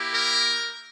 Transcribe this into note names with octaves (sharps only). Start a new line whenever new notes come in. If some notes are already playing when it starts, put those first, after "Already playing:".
Already playing: A#3 E4 G4
A#4